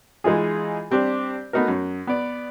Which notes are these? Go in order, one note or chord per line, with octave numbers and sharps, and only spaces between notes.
E3 G#3 D#4 F4 G#4
G3 C4 D4 G4 D5
A3 B3 D#4 F#4 A#4
F#2
B3 D5